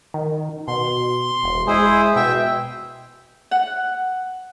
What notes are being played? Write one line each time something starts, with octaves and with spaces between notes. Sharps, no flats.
D#3
B2 C6
E1
G#3 E4 G#4 C5
B2 E5 G5
F#5